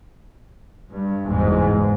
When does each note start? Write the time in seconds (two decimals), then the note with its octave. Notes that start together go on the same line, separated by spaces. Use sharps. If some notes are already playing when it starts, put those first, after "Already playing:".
0.92 G2
1.25 F#1 E2 G#2